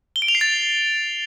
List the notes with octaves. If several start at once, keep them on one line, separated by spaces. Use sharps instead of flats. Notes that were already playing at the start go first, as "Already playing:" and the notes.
G7
D7
F7
C7
A6